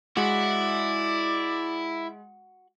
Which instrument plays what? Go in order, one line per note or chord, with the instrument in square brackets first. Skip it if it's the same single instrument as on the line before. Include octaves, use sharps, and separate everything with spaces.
[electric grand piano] G#3 [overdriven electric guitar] E4 [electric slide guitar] F#4 [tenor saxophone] D5